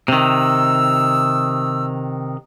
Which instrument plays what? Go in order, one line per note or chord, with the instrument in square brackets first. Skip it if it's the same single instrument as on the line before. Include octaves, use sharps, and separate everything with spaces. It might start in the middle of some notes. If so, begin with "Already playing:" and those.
[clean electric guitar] C3 D#3 [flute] E6